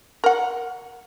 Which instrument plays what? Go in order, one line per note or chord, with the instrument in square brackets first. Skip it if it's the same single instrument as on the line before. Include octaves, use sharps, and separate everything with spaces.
[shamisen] A#4 F#5